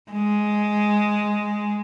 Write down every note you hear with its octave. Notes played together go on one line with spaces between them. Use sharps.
G#3